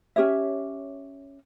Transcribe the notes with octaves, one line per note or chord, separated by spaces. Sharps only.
C#4 G4 C#5 E5